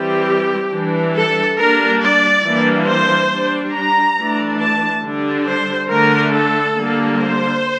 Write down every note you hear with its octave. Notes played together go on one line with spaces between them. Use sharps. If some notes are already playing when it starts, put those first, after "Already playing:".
Already playing: E3 G3 C4 G4
E3 G3 D4
A4
G3 A#3 D4 A#4
D5
E3 G3 A#3 D4
C5
G3 D4
A#5
E3 A3 D4
A5
D3 G3 D4
C5
D3 A3 D4 A#4
A4
D3 G3 A#3
C5